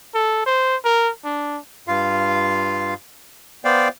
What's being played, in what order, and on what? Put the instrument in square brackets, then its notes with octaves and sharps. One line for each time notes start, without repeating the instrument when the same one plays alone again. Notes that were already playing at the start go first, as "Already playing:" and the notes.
[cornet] A4
C5
A#4
D4
[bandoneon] G2 F4 F5
B3 C5 D5 F5 G5